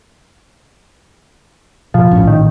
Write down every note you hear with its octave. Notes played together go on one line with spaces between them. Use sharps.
B2 F3
A#1 A2 C#4
D#3